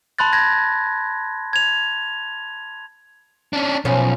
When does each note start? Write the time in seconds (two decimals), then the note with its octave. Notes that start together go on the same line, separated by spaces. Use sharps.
0.19 A5 B5 C6 F#6 A6
0.33 G#6 A#6
1.53 G#6 F7
3.53 C#4 D4
3.85 B1 F3 B3 C#4